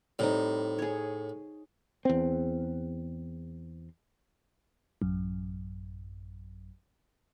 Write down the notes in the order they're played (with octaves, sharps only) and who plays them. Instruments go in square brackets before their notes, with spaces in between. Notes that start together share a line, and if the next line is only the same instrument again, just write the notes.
[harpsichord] A2 [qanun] G3 C4 D#4
[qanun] G#4 C#5
[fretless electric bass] E2 C4
[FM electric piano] A1 F#2